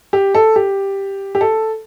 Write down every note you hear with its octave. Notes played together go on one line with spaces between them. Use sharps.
G4
A4
G4
G4
A4